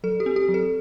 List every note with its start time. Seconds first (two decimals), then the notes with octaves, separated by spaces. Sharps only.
0.04 F#3 A4
0.20 G4
0.26 C4
0.36 G4
0.49 F#3
0.54 A4